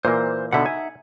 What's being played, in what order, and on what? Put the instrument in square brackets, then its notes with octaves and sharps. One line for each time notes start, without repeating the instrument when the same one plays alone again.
[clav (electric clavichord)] A#2 E3 A#3 [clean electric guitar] C5
[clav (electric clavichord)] B2 D3 B3 [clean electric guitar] D#4 E5 F#5
[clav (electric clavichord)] G#5